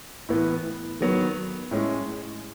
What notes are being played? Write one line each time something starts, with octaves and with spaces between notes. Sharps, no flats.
A2 E3 B3
D#3 F#3 B3
A2 G#3 C#4